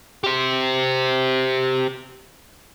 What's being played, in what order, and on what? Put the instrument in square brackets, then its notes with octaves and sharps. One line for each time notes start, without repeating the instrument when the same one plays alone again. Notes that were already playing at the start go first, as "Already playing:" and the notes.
[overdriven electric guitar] G4 C5